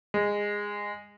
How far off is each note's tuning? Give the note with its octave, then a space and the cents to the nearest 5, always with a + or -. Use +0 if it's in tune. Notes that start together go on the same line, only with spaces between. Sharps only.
G#3 -15